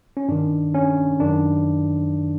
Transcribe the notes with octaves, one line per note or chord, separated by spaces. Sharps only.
C#4
G2 D#3 D4
C#4
F#2 D#3 D4